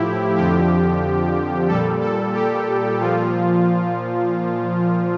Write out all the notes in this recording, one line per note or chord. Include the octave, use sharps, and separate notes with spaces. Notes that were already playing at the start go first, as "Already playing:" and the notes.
Already playing: A2 F3 E4 G4
F2 D3 F3 G4
A#2 G3 A4
A4
G4
A#2 F3 F4